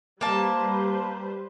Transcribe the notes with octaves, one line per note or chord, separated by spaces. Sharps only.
G3 A#3 B4 C5 A5